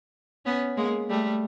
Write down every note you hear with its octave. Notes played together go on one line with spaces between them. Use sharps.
B3 C#4
G#3 A#3
G3 A3